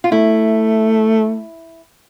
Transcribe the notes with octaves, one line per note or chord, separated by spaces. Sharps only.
F4
A3 E4